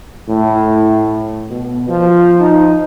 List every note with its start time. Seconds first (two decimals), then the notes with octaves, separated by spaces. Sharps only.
0.28 A2
1.50 B2
1.89 F3
2.40 D#4